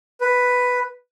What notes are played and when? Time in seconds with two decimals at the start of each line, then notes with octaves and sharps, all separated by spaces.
0.21 B4